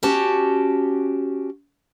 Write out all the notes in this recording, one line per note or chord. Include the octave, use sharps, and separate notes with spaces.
C#4 F#4 G4 A5